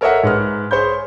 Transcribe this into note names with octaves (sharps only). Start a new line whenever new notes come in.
A4 A#4 C#5 D#5 E5 F#5
G#2 B4 F6
G#4 C5 C#5 B5 G6